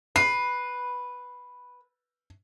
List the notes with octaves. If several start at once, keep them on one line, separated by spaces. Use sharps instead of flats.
B4 C7